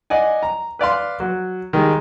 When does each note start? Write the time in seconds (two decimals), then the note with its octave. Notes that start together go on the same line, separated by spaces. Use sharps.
0.10 D5 D#5 F#5 G#5
0.43 A#5
0.79 B4 D5 F5 C6
1.20 F#3
1.73 D#3 G3 G#3